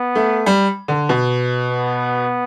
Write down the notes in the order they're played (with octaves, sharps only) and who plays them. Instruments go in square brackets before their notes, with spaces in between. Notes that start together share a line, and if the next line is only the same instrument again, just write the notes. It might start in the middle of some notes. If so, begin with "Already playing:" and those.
Already playing: [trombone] B3
[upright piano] A3
G3
D3
B2
[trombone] B3